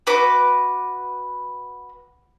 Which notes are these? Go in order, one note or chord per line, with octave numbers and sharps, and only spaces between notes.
F#4 B4 D6